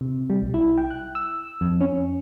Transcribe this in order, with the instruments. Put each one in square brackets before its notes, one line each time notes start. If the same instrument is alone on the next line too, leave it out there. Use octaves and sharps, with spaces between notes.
[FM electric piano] C3
G3
B1
E4
G5
F#6
E6
F2
C#4